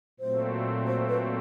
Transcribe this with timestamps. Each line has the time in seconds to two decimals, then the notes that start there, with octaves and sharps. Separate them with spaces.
0.20 A#2 F#3 A3 C4 C5
0.87 C5
1.09 B4